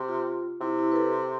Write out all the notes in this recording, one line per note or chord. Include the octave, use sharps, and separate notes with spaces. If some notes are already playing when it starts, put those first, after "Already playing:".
Already playing: C3
F4
C3 E4
E4
B4
A4
G4